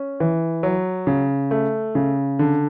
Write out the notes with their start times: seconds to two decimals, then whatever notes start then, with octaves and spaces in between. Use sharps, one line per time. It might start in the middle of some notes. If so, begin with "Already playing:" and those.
Already playing: C#4
0.20 E3
0.63 F#3
1.07 C#3
1.51 A3
1.95 C#3
2.39 D3